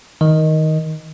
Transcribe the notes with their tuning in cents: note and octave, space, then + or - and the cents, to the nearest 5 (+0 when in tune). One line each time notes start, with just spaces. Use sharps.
D#3 +15 D#5 +0